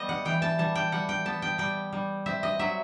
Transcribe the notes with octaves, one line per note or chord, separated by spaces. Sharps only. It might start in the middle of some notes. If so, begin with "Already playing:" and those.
Already playing: G3 B3 D#5
F#5
E3 G5
A5
G3 A5
G5
G3 F#5
G5
B3 A5
G5
G3 G5
G3
C4 E5
D#5
F#3 E5